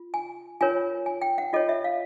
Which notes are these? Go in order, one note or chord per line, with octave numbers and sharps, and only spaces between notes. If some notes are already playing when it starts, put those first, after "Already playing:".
Already playing: F4
G#5
F4 A#4 C#5 G#5
G#5
G5
F#5
F4 A4 C#5 D#5
E5
F5